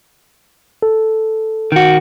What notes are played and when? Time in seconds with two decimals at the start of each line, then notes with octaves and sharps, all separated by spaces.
0.83 A4
1.72 D#3 F#4